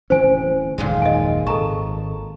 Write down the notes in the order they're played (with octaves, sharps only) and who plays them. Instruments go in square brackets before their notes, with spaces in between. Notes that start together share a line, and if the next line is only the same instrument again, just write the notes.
[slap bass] D1 E3 C#4 [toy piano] C5 G#5
[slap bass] F#1 D#2 [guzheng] A#2 D#3 G#3
[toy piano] D#5 G#5
[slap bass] G#1 [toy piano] A4 A#5 C#6 [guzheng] A5